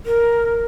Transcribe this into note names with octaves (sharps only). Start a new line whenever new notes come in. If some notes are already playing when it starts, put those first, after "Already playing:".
A#4